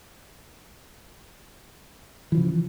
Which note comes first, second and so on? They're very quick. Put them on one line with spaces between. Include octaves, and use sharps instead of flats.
E3 F3 C#3